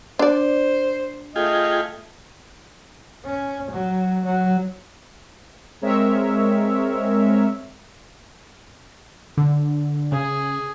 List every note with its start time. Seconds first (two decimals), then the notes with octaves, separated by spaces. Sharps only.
0.19 D4 C5 D5
1.36 A3 F4 G#4 D#5 G5
3.26 C#4
3.71 F#3
4.25 F#3
5.82 G#3 C4 A#4 C#5 E5
9.37 D3
10.12 C#3 G#4